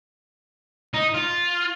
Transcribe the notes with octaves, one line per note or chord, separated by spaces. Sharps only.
D#4
F4